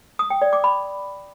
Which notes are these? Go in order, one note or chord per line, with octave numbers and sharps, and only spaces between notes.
D#6
G5
D5
D6
B5